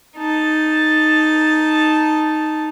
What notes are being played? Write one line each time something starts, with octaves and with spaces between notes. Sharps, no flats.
D#4 A5